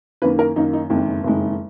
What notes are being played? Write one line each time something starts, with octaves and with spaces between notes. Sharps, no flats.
F#2 D#3 A#3 B4
A#4
F#2 D#3 A#3 D#4
D#4
F#1 F2 D#3 G#3
F#1 F2 D#3 G#3